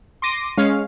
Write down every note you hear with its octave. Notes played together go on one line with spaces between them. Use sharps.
C6 D6 A#6 D#7
G#3 C#4 F5